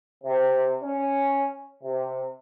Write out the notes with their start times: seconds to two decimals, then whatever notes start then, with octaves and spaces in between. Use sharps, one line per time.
0.24 C3
0.82 C#4
1.82 C3